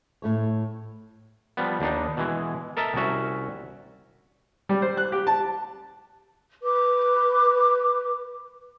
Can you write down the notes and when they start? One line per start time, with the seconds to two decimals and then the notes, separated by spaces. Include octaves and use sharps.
0.22 A2 A3 C#5
1.57 F3 G3 B3
1.80 D#2 D4 D#4
2.17 B2 E3 G#3
2.77 A4 A#4 D#5 E5 A5 A#5
2.95 C2 C#4 F#4 E5
4.69 G3
4.82 C5
4.97 F#6
5.12 G4
5.27 A5
6.63 B4 D6